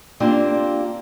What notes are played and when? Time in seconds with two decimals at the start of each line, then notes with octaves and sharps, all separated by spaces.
0.20 A#3 C4 D4 F4 G4